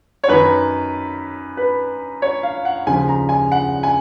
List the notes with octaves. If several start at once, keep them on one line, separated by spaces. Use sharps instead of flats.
C#5
F#2 D#3 B4
B4
C#5
F5
F#5
D#2 C#3 F3 G#5
A#5
G#5
F#5
G#5